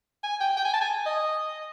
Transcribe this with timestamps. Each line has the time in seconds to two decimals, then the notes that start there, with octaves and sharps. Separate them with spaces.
0.23 G#5
0.40 G5
0.57 G5
0.65 G#5
0.73 A5
0.81 G#5
1.06 D#5